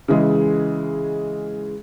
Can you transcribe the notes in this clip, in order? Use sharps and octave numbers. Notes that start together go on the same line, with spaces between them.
C#3 E3 G#3